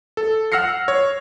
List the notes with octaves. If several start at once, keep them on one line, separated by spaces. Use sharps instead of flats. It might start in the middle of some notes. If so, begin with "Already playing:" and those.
A4
F#5 E6 F6 A#6 C7 C#7
C#5